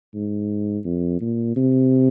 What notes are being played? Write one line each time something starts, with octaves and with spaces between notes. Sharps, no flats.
G#2
F2
A#2
C3